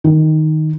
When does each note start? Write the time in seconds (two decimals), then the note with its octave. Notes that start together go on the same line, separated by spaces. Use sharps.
0.04 D#3